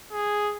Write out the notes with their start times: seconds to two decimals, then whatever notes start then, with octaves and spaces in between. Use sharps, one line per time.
0.13 G#4